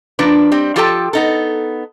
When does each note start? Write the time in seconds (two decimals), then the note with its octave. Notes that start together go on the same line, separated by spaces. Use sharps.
0.19 F3 A#3 D4 B4
0.52 G3 C4
0.76 F3 F4 G4 A4 G5 A5
1.13 B3 D#4 A4